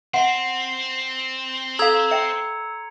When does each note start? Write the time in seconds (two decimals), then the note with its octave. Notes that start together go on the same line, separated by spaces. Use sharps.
0.14 C4 E5 F#5 C6 C7
1.79 A4 F5 A#5 E6 G#6 F7
2.11 E5 G5 C#7